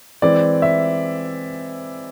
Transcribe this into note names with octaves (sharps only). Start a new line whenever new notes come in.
E3 G#3 C4 D5
E5